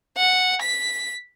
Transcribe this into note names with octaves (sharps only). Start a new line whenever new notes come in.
F#5
B6